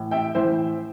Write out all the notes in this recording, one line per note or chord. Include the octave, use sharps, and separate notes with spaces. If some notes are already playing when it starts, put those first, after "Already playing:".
Already playing: A2 E3
E5 G5
A2 E3 C5 E5